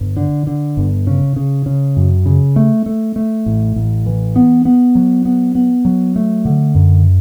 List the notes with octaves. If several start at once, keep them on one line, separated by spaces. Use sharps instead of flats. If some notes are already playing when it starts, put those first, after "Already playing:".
Already playing: G1
D3
D3
G1
C#3
C#3
C#3
F#2
C#3
A3
A3
A3
A1
A1
E3
B3
B3
F#3
B3
B3
F#3
A3
D3
F#2